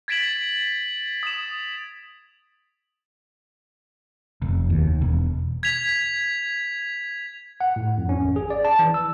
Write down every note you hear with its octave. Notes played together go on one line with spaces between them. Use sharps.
G#6 A6 B6 D7 E7 F#7
D#6 E7
F1
D#2
E1
G#6 B6 F7
F#5
A2
F2
C#4
G#1
G#4
D5
A5
E3
E6